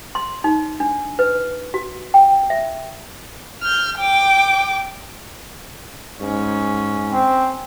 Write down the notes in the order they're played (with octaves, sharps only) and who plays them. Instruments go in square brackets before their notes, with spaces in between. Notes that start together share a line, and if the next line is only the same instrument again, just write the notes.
[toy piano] C6
D#4
D4
B4
F#4
G5
E5
[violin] F6 G6
G5 D6
[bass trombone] G#2 [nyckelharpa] C#4
[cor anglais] C4